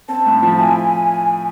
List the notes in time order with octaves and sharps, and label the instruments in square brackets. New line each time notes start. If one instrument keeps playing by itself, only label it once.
[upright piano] C4 [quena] A5
[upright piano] A2
F3
[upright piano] E4 [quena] G#5